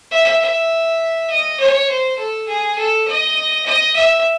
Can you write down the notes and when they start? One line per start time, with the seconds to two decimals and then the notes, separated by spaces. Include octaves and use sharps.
0.11 E5
0.41 E5
1.29 D#5
1.60 C#5
1.89 C5
2.18 A4
2.48 G#4
2.78 A4
3.07 D#5
3.66 D#5
3.96 E5